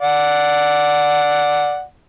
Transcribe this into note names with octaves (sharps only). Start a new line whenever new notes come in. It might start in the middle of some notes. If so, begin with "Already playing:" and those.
D5 F#5